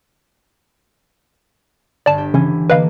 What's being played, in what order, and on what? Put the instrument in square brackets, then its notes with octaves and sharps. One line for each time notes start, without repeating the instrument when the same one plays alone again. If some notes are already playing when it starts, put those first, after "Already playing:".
[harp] G1 [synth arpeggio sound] D5 A5
[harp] G4
[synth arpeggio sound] C#3 C#4 [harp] E3
[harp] D3 A#3 [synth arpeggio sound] B4 D#5 F5